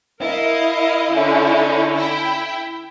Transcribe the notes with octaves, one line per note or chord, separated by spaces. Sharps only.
E4 A#4 D#5 F5
D3 C#4 D#4
E4 G5